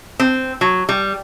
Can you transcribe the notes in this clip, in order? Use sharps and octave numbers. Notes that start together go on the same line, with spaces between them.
C4
F#3
G3